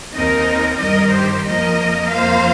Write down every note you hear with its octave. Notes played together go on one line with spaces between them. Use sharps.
D#2 D#3 C4 D#4 A#4 D#5
G2 D#3 G3 A#4 D#5
G4 C5
F2 F3 A#3 A#4 D#5
F2 F3 A#3 C5 F5